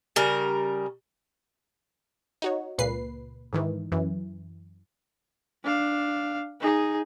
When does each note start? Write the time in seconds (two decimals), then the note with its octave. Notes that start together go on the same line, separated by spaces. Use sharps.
0.16 C#3 G3 A#4
2.42 D#4 F#4 C#5
2.78 C#2 A#2 B4 C7
3.53 G#2 D#3 E3
3.92 F#2 E3
5.63 D4 F5
6.60 D#4 G#4